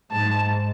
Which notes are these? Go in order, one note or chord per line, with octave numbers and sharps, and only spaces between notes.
G#2 A5